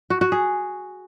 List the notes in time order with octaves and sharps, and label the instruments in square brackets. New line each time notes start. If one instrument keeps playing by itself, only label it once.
[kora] F#4
F#4
G#4